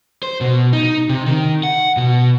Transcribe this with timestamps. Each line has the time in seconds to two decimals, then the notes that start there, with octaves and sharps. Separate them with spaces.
0.23 C5
0.41 B2
0.73 D#4
1.09 C3
1.26 D#3
1.63 F#5
1.97 B2